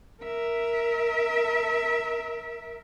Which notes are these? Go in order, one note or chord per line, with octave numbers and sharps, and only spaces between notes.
A#4 E5